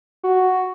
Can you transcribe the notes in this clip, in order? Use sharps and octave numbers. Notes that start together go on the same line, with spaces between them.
F#4